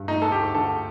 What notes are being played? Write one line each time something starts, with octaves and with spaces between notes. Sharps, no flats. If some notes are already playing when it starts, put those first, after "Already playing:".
Already playing: G2
A3 D#4
A4
D2 G4
D3 A4